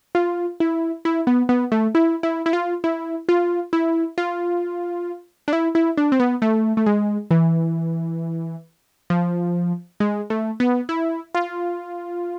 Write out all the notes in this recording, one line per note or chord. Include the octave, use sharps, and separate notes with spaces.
F4
E4
E4
B3
B3
A3
E4
E4
E4
F4
E4
F4
E4
F4
D4
E4
E4
D4
C4
B3
A3
A3
G#3
E3
F3
G#3
A3
B3
E4
F4